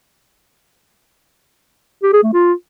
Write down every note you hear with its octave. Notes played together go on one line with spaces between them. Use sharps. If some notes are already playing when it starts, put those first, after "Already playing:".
G4
G#4
A3
F4